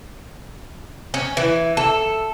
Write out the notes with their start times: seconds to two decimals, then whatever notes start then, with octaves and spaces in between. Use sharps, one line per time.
1.14 C#4
1.37 E3
1.77 A4